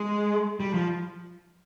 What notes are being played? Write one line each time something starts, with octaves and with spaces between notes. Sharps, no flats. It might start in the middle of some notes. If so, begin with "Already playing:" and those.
Already playing: G#3
G3
F3